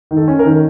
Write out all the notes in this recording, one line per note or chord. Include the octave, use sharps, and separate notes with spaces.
D#3
A4
C#4
A#4
D#3